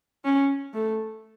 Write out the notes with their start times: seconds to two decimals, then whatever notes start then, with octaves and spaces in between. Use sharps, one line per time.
0.24 C#4
0.74 A3